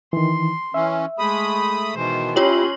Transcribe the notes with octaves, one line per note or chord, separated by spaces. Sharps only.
D#3 E3 C6
E3 C#4 E5
G#3 A3 B5 D#6
B2 D#3 E3 C5
C#4 E4 F4 G4 C#5 C6 F#7